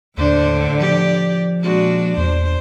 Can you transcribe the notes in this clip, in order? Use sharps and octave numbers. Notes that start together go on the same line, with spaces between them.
D#2 A2 D3 D4 C5
F3 G4 D5
A#2 G#3 D4 F#4
E2 C5